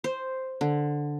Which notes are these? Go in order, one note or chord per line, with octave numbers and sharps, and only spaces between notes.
C5
D3